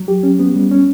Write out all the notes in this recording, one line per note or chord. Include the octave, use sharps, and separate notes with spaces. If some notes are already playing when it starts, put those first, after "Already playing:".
Already playing: F#3
G4
C#4
B3
G3
C#4